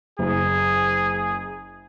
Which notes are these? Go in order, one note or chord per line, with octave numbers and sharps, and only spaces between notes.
F#1 G#4